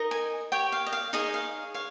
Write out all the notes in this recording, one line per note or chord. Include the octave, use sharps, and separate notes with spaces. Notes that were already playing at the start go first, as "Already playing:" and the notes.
Already playing: D#4 A#4 D#5
G#5
G4 C#5 G5
F5
D#5
F5
D#4 G#4 C#5 D#5
F5
C#5 F5